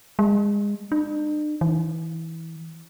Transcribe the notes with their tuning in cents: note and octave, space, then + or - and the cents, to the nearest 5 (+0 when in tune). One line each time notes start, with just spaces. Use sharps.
G#3 -25
D4 +45
E3 -20